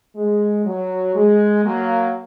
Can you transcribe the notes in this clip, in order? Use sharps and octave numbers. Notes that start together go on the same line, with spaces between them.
G#3
F#3
G#3
F#3 A#3